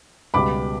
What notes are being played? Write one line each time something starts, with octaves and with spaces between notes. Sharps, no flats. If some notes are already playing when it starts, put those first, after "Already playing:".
C#2 B2 G3 B3 B5 D6